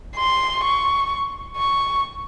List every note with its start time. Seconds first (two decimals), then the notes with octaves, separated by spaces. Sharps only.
0.16 C6
0.64 C#6
1.57 C#6